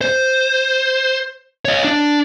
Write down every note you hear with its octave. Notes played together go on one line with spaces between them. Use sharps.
C5
C#5 D#5
D4